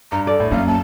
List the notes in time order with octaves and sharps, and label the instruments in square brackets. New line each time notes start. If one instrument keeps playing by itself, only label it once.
[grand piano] G2 [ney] A#5
[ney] A4 [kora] D5
[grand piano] A2
[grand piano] F#2 [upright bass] A#3 [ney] F5
[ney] A5